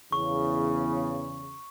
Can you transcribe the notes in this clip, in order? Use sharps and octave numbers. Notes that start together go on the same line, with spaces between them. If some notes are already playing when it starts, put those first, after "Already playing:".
E2 C#3 C#6